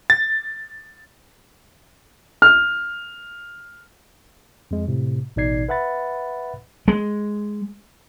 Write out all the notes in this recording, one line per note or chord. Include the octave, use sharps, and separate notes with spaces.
A6
F6
F2 G#3
A2 C3
A1 B2 D#4 D5 G#6 C7
B4 E5 F#5 B5 A6
G#3